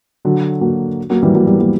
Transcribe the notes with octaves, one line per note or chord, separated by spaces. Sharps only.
D3 F#3
F#3 A#3
F#3 A#3
E3 G3
F#3 A#3
G3 B3
F#3 A#3